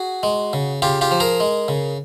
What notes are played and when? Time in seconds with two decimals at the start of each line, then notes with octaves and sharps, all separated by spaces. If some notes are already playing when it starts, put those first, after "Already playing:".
Already playing: F#4 G#4
0.23 G#3
0.53 C#3
0.82 C#3 F4 G4
1.01 F4 G4
1.11 F3
1.20 G#4 A#4
1.40 G#3
1.68 C#3